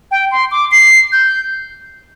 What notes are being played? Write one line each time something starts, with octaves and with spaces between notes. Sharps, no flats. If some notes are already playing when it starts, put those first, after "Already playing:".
G5
C6
D6
C7
G6